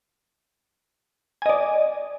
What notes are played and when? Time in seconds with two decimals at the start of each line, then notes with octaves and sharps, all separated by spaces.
1.42 G#5
1.46 D#5
1.49 D5